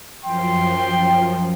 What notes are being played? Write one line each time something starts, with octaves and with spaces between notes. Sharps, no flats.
F#2 F3 G5 C6